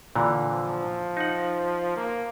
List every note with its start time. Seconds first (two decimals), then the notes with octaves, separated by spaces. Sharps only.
0.16 A#2 D3 E3
0.50 F3
1.17 D#4 F#5
1.97 A#3